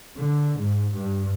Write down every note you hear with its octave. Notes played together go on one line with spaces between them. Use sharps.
D3
G#2
G2